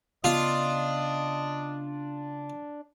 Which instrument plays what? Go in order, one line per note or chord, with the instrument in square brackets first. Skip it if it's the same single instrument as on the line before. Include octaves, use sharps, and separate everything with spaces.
[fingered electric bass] C#3 B3 [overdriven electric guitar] D4 [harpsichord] F4 [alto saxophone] D#5